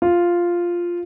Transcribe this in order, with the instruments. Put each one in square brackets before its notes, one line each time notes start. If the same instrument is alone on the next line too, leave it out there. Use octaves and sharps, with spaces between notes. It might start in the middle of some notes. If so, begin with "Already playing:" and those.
[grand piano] F4